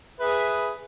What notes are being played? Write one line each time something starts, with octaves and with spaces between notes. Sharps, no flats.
G#4 B4 E5